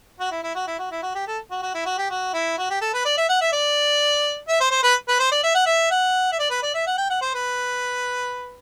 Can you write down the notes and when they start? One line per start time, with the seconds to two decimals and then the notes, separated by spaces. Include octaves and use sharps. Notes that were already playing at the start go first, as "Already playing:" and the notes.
0.20 F#4
0.31 E4
0.43 E4
0.55 F#4
0.67 E4
0.79 F#4
0.91 E4
1.02 F#4
1.15 G4
1.27 A4
1.51 F#4
1.62 F#4
1.74 E4
1.86 F#4
1.98 G4
2.10 F#4
2.33 E4
2.58 F#4
2.70 G4
2.81 A4
2.94 B4
3.05 D5
3.18 E5
3.29 F#5
3.41 E5
3.53 D5
4.49 E5
4.61 C5
4.71 C5
4.83 B4
5.08 B4
5.20 C5
5.32 D5
5.43 E5
5.55 F#5
5.66 E5
5.91 F#5
6.32 E5
6.39 D5
6.50 B4
6.62 D5
6.74 E5
6.87 F#5
6.98 G5
7.10 F#5
7.22 C5
7.34 B4